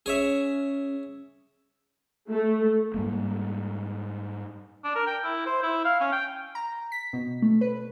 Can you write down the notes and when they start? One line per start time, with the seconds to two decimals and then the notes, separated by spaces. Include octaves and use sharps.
0.06 C#4 G#4 C#5 E5
2.30 A3
2.94 G#2 G3 A#3
4.84 D4
4.96 A#4
5.07 G5
5.24 E4
5.47 C5
5.63 E4
5.85 F5
6.00 C#4
6.12 G5
6.55 A#5
6.92 B6
7.13 B2
7.42 A3
7.61 B4